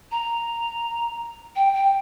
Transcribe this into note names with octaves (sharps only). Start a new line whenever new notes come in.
A#5
G5
G5